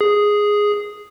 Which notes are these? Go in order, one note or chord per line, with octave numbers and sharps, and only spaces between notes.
G#4